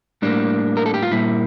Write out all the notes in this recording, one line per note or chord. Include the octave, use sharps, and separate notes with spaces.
A2 G3 A#3 D4
A#4
A4
G4
F4
A#2 G3 A#3 E4